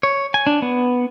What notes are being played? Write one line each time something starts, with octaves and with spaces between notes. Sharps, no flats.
C#5
G#5
D4
B3